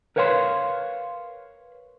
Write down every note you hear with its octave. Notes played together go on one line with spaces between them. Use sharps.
A#4 B4 C#5 F5 G5 C6